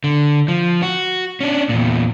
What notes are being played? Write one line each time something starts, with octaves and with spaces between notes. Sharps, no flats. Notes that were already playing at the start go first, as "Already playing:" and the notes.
D3
F3
F#4
C#4 D4
E2 A#2